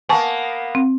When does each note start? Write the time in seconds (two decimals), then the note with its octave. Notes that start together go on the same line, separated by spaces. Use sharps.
0.09 A#3 B3 G#5 A5 C#6
0.75 C4